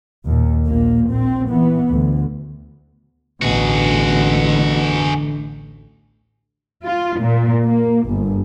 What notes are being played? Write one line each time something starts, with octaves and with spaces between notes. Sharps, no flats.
D#2 A#2
A#1 A#2 A#3
A#1 C4
E3 B3
D2
A1 D2 B2 D3 F#4 G#4
F4
A#2
A#3
G1